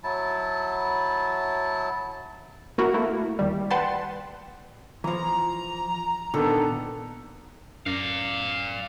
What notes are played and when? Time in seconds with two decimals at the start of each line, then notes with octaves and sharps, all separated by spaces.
0.04 F#3 E4 A5
2.78 A#3 E4 F#4 A#4
2.94 A3 A#3 E4
3.39 D#2 G3
3.70 B4 F#5 G5 A5 C6 A6
5.04 E3 F3 A#5
6.34 A#2 D3 D#3 B3 A4
7.86 F#2 D5 F5